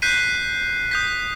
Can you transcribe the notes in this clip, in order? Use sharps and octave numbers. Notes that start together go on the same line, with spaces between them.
F#6 G6 B6 C7 D#7
D#6 G6 B6